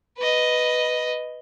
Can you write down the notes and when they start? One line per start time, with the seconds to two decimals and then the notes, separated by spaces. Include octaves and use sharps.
0.18 B4 D#5